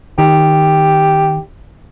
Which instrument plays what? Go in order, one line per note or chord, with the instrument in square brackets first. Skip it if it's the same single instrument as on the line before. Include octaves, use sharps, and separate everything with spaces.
[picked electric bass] D#3 [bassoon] G4